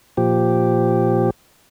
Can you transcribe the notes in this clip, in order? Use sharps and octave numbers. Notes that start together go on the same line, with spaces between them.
A#2 F3 G4